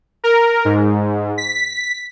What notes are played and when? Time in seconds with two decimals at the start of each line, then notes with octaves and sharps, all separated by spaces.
0.24 A#4
0.65 G#2
1.38 B6